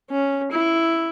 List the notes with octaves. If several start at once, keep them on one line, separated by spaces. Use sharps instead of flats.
C#4
E4